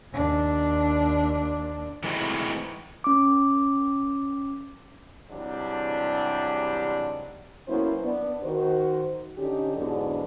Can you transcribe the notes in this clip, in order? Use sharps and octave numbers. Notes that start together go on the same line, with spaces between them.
D#2 D4
E3 G#3 A3 C4 D#4 F#4
C#4 D6
G#2 C3 E3 F#3 G3 D4
F#3 A#3 B3 C#4 E4 C5
B3 D4
D#3 F#4 C5
D3 C#4 D#4 G4
E2 G#2 D3 F#3 B3 D4